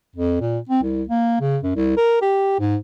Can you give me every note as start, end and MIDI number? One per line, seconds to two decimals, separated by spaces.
0.16 0.37 41
0.41 0.59 46
0.69 0.82 60
0.83 1.03 36
1.09 1.40 58
1.41 1.58 49
1.63 1.74 42
1.76 1.92 36
1.97 2.19 70
2.22 2.57 67
2.60 2.76 44